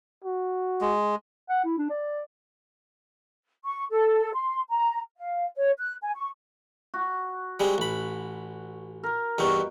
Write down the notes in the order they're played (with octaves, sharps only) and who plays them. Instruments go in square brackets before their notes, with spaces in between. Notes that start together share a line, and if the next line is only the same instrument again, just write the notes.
[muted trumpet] F#4
[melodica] G#3
[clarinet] F#5
E4
D4
D5
[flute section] C#6
A4
C6
A#5
F5
C#5
F#6
G#5
C#6
[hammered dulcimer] F#4
[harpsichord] G3 G#3 C4
A1 B5
[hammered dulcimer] A#4
[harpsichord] E2 G2 C4 [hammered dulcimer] B2 G5 C#6